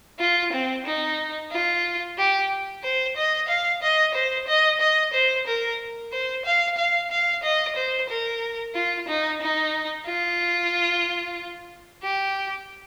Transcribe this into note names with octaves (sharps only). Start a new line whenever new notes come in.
F4
C4
D#4
F4
G4
C5
D#5
F5
D#5
C5
D#5
D#5
C5
A#4
C5
F5
F5
F5
D#5
C5
A#4
F4
D#4
D#4
F4
G4